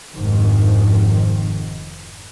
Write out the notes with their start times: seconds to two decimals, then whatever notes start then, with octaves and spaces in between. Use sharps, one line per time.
0.14 F1 G#2 D#3 F3